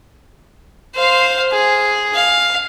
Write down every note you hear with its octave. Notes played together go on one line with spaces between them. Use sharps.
C5 F5
G#4
F5